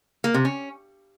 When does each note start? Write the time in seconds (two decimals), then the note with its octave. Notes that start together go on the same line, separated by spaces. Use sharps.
0.24 A#3
0.34 C3
0.45 C#4